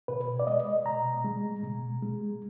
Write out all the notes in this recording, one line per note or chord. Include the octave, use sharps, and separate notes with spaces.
B2 B4
D5
G#3 D#5
B2 A#5
G#3
B2
G#3